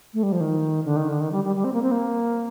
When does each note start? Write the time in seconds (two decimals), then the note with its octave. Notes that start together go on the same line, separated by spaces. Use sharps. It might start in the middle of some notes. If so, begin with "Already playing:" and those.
0.14 A3
0.23 G3
0.32 F3
0.41 D#3
0.85 D3
0.96 D#3
1.09 D3
1.21 D#3
1.32 G3
1.44 G3
1.56 G3
1.64 C4
1.73 A#3
1.83 C4
1.91 A#3